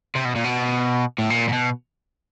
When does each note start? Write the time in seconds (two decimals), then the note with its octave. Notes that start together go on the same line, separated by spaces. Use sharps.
0.15 C3
0.25 B2
0.36 A#2
0.44 B2
1.18 A2
1.30 A#2
1.49 A#2
1.53 B2